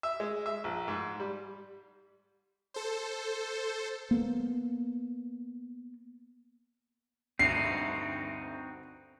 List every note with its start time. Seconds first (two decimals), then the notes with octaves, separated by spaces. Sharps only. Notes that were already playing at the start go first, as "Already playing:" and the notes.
0.03 E5
0.20 G#3
0.46 E5
0.64 A#1
0.88 G#2
1.20 G3
2.74 A4 C5
4.11 A#3 B3
7.39 D2 G2 C4 D#4 F#4 C7